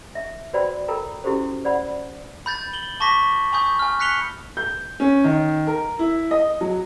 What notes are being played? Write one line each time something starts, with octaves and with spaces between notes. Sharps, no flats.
E5
F#4 B4 C5 D5 G5 B5
A4 A#4 G5 A#5 B5
C#4 E4 F#4 G4 A4 C5
C5 D5 F#5 B5
B5 G6 A6
F#7 G7
A5 C#6 D6 A#6 B6
G#5 B5 C#6 D#6 G6
G#5 F6
F#6 B6 C#7 F7 G7
G6
C#4
D#3
A#4
E4
D#5
F#3